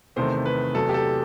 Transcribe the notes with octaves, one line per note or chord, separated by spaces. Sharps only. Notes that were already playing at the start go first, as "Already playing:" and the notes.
E2 C3 D#3 A3 C5
B4
E2 C3 F#3 A3 A4
G4
A4